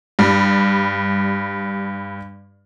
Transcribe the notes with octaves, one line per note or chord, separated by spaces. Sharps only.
G2 G3